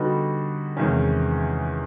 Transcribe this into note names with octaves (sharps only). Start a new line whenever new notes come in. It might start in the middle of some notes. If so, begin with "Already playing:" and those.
Already playing: D3 G3 B3 D#4 F#4
E2 C3 D#3 G#3 C#4